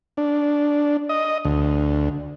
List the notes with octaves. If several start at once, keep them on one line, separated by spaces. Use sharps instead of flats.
D4
D#5
D2